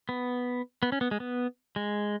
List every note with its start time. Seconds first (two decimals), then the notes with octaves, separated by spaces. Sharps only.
0.09 B3
0.83 B3
0.92 C#4
1.01 B3
1.11 G#3
1.20 B3
1.76 G#3